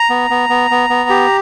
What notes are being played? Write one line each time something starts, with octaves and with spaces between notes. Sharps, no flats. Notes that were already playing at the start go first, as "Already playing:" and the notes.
Already playing: A#5
B3
B3
B3
B3
B3
G4